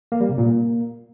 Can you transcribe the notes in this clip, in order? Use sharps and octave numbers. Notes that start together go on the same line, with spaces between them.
A#3
G3
C3
A#2
A#3